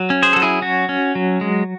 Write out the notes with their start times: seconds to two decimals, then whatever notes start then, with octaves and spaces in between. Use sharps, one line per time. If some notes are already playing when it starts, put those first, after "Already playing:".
Already playing: F#3
0.10 C#4
0.22 G#4 C5
0.33 F#3 A4
0.42 E4 G#4
0.62 C#4 F#4
0.89 C#4
1.15 F#3
1.41 G#3